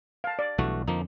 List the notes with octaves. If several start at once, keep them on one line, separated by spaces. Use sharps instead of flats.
F5 A5
D5
B1 G2 E3 A3 F#4
F2 D3 F3 A#3 D#4